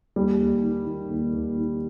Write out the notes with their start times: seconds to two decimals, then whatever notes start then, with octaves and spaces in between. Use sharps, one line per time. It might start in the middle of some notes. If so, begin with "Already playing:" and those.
0.16 D#2 G3
0.40 D#2
0.63 D#3
0.87 D#3
1.10 D#2
1.33 D#2
1.57 D#3